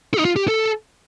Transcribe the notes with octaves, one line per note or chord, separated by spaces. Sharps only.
A4
D#4
F4
G4
A4